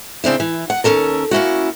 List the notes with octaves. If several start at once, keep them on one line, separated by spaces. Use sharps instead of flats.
C#3 C4 D4 E4
E3
F#5
D#2 C#3 C#4 A4 A#4
A#3 C#4 E4 F#4